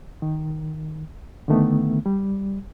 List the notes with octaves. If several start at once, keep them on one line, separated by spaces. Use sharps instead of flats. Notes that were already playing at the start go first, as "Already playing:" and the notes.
D#3
D3 D#3 A3 B3
G3